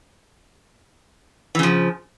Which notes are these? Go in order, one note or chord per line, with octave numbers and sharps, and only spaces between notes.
C#3 E3 F3